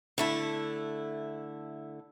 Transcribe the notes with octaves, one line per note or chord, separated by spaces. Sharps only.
D3 A3 E4